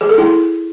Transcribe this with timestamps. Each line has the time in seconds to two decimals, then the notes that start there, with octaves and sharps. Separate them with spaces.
0.01 G#4
0.09 A4
0.18 E4